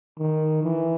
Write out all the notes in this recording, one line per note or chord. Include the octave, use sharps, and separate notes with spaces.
D#3
E3